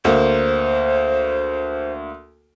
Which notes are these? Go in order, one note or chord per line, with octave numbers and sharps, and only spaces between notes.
D2 A#3 C5